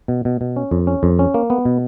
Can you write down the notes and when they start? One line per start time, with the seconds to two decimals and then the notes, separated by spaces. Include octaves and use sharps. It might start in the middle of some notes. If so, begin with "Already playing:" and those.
0.08 B2
0.25 B2
0.41 B2
0.56 C#4
0.71 F2
0.87 C#4
1.03 F2
1.19 C#4
1.34 A#3
1.50 B3
1.65 B2